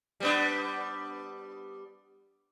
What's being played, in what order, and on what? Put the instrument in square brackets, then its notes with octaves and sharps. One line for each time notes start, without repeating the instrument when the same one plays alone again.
[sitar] G3 B3 D4